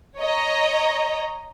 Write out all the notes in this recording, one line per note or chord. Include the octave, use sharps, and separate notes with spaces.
C#5 D#5 A#5